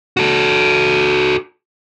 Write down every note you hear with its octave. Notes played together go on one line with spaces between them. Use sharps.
F#4 A4